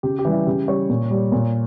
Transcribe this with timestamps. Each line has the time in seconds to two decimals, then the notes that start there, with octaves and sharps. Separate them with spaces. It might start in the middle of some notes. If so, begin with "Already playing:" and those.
0.03 C#3 G4
0.19 G4
0.25 E3 G3
0.33 E4
0.46 C#3 G4
0.67 G3 C#5
0.90 A#2
1.10 G3
1.32 A#2